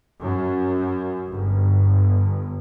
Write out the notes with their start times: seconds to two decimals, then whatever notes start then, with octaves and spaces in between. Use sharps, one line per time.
0.21 F#2
1.28 G1